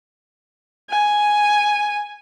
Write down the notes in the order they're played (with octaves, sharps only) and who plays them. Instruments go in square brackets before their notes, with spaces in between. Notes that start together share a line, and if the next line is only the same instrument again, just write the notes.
[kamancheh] G#5